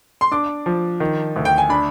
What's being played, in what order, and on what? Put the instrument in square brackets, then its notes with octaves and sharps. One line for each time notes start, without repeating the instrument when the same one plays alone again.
[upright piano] C6
[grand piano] D4 [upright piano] D6
[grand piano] F3
D#3
D2
[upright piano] G5
G#5
[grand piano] D4 [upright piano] B5